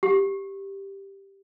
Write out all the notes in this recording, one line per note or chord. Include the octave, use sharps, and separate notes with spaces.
G4